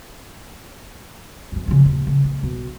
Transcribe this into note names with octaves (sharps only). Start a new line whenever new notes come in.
G1 F2
C#3 F3
D#1
C#3
A#1
B1